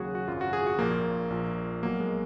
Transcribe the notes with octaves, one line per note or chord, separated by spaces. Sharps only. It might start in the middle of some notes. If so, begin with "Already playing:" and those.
Already playing: D#2 C#3 F#3 F#4 G#4
F#4
G#1 F#2 C#3 F4
F#4
G#4
F#4
A#1 A#2 F3 A#3
A#1 A#2 F3
B1 B2 F#3 A#3
G#3